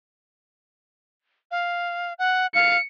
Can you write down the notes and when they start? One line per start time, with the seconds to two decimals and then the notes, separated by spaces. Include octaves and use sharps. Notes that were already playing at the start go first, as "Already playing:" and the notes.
1.51 F5
2.19 F#5
2.55 F5 C#7